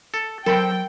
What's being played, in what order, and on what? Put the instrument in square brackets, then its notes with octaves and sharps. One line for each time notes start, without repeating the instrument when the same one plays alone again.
[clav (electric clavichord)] A4
[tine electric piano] F#3 [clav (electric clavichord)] C4 A4 [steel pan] A#4 B5 [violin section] G5